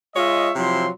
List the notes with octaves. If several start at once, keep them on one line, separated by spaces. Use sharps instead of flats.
G#3 F4 C#5 D#5 E5
C3 F3 F#3 E4 C6